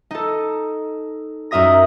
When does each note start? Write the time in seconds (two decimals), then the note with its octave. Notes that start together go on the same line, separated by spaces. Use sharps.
0.11 D#4 A4
1.51 F#2 D#4 A#4 E5 D#6 A#6